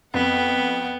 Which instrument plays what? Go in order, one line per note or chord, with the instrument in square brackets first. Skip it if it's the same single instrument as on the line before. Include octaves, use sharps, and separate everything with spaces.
[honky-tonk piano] F2 [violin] B3 [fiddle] F#5 G5